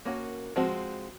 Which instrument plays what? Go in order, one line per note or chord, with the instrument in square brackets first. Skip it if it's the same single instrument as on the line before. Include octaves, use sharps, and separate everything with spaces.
[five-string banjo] A#3 C#4 F#4
F3 G#3 C4 F#4